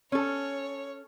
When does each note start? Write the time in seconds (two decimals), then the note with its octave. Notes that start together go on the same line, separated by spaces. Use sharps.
0.12 C#4 A4 C#5